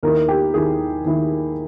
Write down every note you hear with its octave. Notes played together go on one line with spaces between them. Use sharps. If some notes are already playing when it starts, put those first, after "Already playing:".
D#2 D#3 A#3 E4 A#4
G4
D#2 D#3 A#3 E4 G#4
D#2 D#3 A#3 E4